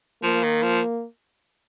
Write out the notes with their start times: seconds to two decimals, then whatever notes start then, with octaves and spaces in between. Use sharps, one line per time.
0.23 F3 A#3
0.43 D#3
0.62 F3